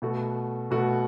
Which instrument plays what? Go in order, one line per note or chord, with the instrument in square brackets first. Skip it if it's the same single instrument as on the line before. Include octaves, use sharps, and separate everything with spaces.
[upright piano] B2 A3 F#4
B2 A3 F#4